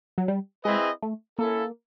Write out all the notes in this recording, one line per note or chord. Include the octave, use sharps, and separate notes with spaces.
F#3
G3
G#3 C4 E4 G#4 B4 D#5
A3
A#3 C#4 E4 A4